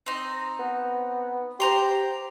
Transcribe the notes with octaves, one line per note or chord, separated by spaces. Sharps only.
C4 D#4
B3
G4 C5 A#5 C6